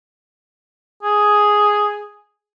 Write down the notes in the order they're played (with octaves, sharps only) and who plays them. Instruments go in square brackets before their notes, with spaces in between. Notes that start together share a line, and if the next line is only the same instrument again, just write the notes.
[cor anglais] G#4